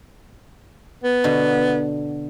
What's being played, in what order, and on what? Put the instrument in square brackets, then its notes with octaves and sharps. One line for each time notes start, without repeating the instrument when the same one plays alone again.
[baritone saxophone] B3
[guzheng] B2 D3 F#4